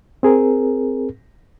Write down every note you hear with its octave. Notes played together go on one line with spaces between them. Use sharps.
C4 G#4 A#4